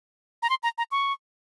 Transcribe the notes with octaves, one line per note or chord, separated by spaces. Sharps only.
A#5
C6
A#5
A#5
C#6